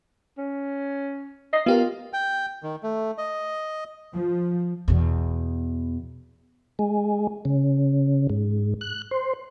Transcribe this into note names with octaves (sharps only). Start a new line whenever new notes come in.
C#4
D#5 C7
B3 F4 G4 A#4
G5
D#3
A3
D#5
F3
E2 B2
G#3
C#3
G#2
F#6
C5